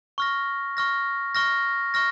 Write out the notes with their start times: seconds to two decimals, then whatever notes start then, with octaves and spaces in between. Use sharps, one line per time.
0.18 C#6 F6 A#6
0.77 C#6 F6 A#6
1.35 C#6 F6 A#6
1.94 C#6 F6 A#6